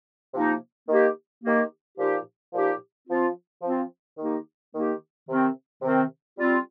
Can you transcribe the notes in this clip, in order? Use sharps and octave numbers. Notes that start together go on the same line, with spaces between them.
C3 F3 A#3 D#4
D#3 A#3 G4
D#3 A#3 G4
A#2 F3 D#4 G4
A#2 F3 D#4 G4
F3 C4 F4
F3 C4 F4
D#3 A#3 D#4 G4
D#3 A#3 D#4 G4
C3 D#3 C4
C3 D#3 C4
G3 C4 F4